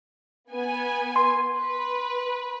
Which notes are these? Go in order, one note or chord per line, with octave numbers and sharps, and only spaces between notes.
B3 G#5
C6
B4